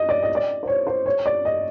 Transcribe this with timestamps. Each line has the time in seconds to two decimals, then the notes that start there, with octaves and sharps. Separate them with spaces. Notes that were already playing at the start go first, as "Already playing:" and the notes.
Already playing: D#5
0.09 D5
0.23 D#5
0.35 D5
0.63 C5
0.67 C#5
0.87 C5
1.06 C#5
1.26 D5
1.45 D#5